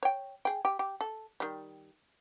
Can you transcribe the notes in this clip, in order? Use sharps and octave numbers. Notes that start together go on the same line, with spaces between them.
C#5 G5
G#4 G5
G4
G4
A4
D#3 G3